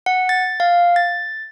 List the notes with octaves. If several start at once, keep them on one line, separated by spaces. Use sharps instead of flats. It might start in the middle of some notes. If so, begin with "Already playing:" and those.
F#5
A6
F5
A6